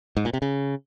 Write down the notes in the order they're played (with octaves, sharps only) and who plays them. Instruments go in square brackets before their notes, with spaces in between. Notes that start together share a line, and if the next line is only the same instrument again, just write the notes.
[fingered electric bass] G#2
A#2
C3
C#3